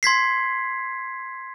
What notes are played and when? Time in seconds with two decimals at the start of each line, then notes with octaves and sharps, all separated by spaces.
0.03 C6 G#6 B6 C7